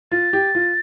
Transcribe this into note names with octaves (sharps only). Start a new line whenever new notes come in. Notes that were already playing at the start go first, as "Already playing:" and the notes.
F4 A6
G4
F4